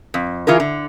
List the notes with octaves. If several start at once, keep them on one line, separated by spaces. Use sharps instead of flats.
F2
E3 F4 G#4 A#4
D3